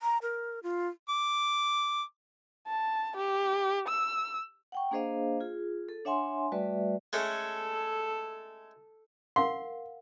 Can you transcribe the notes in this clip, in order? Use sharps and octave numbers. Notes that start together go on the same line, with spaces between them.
A#5
A#4
F4
D6
A5
G4
E6
F#5 G5 C#6
A#3 D4 G#4 C5 D#5 F5
F4 G#4
A4
D4 C#5 E5 F#5 G#5 C6
G3 A3 F#4 B4 D5 E5
G#3 A3 C#4 A4
A#4 F5 F#5 C6